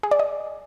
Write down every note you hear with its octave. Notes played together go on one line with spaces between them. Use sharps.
G#4
D5
D#5